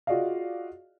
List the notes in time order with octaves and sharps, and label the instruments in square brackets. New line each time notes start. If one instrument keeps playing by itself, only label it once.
[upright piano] F4 F#4 G#4 D5 D#5 F5